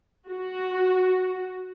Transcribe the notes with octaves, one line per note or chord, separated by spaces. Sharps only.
F#4